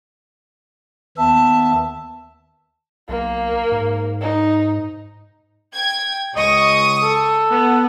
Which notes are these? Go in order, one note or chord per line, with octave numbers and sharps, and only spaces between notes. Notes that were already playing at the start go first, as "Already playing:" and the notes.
D#2 B3 E5 A5
B1 A#3
G#2
D#4
G5 G#6
C#2 D#5 C#6 D#6
A4
B3